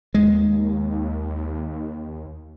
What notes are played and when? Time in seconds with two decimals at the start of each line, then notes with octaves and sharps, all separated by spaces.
0.14 D#2 G#3